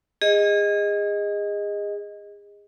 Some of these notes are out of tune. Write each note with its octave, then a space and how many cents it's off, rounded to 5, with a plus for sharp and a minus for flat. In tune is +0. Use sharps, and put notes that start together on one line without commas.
G#4 -30 D#5 +0